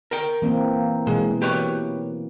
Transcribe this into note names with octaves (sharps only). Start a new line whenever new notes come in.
A#4 G5
E3 A#3 C4
B2 E3 G#3
G4 B4 C#5